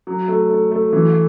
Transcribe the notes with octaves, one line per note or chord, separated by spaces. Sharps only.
F#3
A3
A3
A3
E3